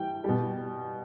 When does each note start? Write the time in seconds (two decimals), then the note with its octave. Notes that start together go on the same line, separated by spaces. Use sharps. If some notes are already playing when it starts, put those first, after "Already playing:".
Already playing: E3 G3 G5
0.24 B2 G3